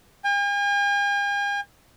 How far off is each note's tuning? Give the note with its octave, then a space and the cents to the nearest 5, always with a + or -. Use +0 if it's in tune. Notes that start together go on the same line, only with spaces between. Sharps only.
G#5 -45